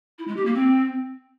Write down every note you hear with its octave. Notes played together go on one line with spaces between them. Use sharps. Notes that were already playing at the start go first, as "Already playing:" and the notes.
E4
G#3
G4
A#3
C4